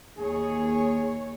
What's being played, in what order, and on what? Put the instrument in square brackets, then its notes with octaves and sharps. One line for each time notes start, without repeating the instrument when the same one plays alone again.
[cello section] D#2 C#5 [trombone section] G#4